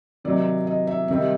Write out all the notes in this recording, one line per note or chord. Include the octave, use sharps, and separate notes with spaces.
C3 D#3 F#3 D5
D#5
E5
C3 D#3 G3 E5